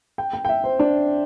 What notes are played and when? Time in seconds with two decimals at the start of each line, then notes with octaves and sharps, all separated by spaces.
0.18 G5
0.33 G5
0.45 G5
0.49 E5
0.64 C5
0.79 D4